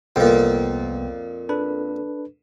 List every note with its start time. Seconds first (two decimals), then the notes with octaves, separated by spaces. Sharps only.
0.16 C2 F2 A#2 B3 G5
1.49 D4 A4 B4